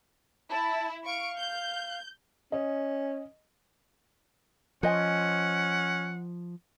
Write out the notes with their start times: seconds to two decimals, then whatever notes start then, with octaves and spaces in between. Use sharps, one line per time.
0.51 E4 A5
1.06 F5 C#6 D7
1.39 G6
2.52 C#4 D#5
4.83 F3 C#4 C5 D#5 F#5 G#5